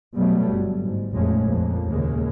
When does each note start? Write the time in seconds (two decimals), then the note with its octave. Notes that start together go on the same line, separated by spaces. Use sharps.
0.15 B2 F#3 G3 A3
0.52 G1
0.82 G#2
1.12 A#1 F2 A#2 G#3 A3 C#4
1.44 F2 A#3
1.88 D#2 A#2 C#3 G#3 A#3